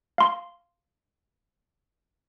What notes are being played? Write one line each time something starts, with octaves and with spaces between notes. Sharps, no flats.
F5 C6